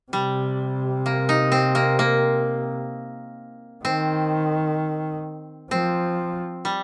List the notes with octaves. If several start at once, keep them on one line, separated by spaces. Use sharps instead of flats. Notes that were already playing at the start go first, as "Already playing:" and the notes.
C3 G3
A#3
D#4
C4
A#3
A#3
D#3 C4
F3 C4
G3